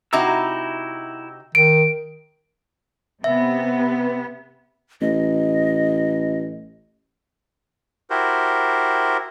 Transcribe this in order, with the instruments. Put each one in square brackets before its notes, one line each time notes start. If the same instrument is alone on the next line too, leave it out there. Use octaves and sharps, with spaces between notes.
[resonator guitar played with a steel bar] C3 D#4 F#4 [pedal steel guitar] E4 A#5 E6
[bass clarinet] D#3 [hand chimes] D7
[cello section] C3 B3 [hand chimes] E5
[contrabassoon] A1 [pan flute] D#5
[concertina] E4 F#4 G4 A#4 C5